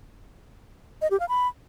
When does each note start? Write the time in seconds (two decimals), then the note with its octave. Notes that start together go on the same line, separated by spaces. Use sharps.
1.02 D#5
1.11 G4
1.20 F5
1.29 B5